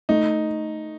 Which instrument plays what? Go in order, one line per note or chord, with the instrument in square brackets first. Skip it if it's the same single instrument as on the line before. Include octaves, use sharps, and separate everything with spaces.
[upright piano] A3 [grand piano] D#4